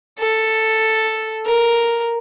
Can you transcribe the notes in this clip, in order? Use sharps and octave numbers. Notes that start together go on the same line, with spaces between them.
A4
A#4